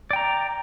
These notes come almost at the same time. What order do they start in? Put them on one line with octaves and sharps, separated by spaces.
D5 G5 A#5